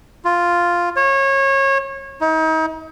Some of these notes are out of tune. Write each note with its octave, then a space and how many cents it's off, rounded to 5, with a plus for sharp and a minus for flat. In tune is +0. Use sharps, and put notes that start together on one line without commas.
F4 +0
C#5 -25
D#4 +40